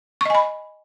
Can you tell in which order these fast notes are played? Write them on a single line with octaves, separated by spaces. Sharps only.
C#6 D#5 G#5 B5